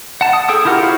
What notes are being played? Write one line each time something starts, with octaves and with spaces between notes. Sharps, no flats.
F#5 A5
D#6
G#4 A4 G5 D#6
E4 F4 G4 A#4 F#5
E4 F#4 G#4 C5 F5